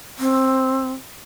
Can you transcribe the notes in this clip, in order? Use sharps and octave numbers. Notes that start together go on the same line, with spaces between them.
C4